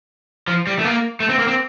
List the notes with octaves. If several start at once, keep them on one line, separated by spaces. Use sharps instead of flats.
F3
G3
A3
A#3
A3
C4
A#3
C4